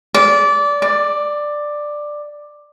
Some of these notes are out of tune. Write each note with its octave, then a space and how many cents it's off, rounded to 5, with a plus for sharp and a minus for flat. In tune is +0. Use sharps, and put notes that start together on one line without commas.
D5 -20
D5 +10